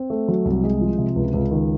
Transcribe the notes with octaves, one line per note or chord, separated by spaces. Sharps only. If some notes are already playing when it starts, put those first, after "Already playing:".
Already playing: C4
A3
F#3
C2
G#3
F3
C3
C#2
C#2
D#3